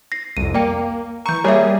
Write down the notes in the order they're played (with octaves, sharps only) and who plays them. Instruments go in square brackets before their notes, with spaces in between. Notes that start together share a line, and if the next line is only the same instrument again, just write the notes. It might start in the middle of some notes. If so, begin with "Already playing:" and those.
[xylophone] A#6 C7
[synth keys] C2 F2 [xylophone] D#7
[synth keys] A#3 [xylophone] D5 G5
[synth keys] E3 C#6 [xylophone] A#5 G6
[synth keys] G3 A#3 G#4 [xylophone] C#5 E5